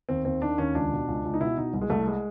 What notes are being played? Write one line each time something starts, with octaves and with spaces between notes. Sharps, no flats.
D#2 C4
D#2 C4
D#3 D4
D#2 C#4
C#2 D4
B2
C#2
C#2
D#4
B2 E4
B2 D#4
C2
G#3
C2 A3
G#3